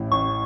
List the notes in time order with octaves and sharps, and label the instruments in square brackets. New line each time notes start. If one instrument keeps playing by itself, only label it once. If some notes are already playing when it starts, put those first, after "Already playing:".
Already playing: [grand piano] A1 A2
[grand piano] A1 [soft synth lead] C#6